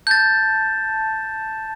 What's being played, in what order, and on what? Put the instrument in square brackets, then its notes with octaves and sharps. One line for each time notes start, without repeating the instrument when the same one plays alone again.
[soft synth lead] A5 [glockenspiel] G6 A6